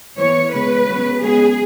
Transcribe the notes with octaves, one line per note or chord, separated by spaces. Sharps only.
E3 B3 C#5
C#3 G#3 B3 B4
C#3 F#3 B3
C#3 G#3 B3 G#4